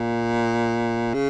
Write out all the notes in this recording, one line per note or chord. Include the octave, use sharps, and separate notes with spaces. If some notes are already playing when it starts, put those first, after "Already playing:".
Already playing: A#2
C#3